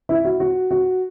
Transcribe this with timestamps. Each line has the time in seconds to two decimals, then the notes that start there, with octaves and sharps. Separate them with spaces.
0.09 E4
0.25 F#4
0.40 F#4
0.71 F#4